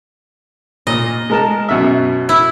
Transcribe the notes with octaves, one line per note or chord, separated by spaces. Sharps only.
A#2 D#5
G#3 A#4 A5
F#2 B2 E5
E4